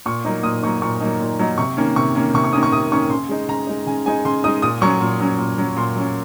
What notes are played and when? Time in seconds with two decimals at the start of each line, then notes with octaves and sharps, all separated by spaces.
0.06 A#2 C#6
0.25 F#3 A#3 D#4
0.43 A#2 D#6
0.63 F#3 A#3 D#4 C#6
0.82 A#2 C#6
1.00 F#3 A#3 D#4
1.20 A#2
1.39 F#3 A#3 D#4
1.58 C3 C#6
1.77 D#3 A#3 C#4
1.96 C3 C#6
2.15 D#3 A#3 C#4
2.34 C3 C#6
2.44 C#6
2.53 D#3 A#3 C#4 D#6
2.63 C#6
2.72 C3 D#6
2.92 D#3 A#3 C#4 C#6
3.10 C#3 C6
3.29 G#3 D#4
3.48 C#3 A#5
3.67 G#3 D#4
3.87 C#3 G#5
4.06 G#3 D#4 G#5
4.25 C#3 C6
4.44 G#3 D#4 D#6
4.62 A#2 D#6
4.81 F#3 C#4 C#6
5.01 A#2
5.20 F#3 C#4
5.39 A#2
5.58 F#3 C#4
5.76 A#2 C6
5.96 F#3 C#4